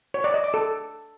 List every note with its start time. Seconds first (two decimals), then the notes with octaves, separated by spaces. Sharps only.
0.14 C#5
0.24 D5
0.34 D#5
0.44 D6
0.54 A4